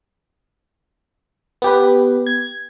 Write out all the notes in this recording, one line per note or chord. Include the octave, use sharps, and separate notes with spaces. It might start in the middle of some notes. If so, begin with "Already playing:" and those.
B3 G4 B4
G#6